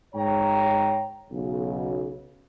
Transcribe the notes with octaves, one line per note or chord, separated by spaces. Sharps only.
G#2 C#5 G5 A#5
B1 C#3